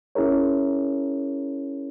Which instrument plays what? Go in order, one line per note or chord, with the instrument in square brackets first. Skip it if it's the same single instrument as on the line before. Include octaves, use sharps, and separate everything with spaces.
[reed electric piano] C#4 E4 G#4 A#4 C#5